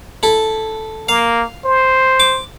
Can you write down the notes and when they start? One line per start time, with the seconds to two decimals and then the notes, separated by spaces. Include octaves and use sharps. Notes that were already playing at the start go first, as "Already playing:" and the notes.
0.23 E4 A4
1.09 A#3 F5
1.65 C5
2.20 D6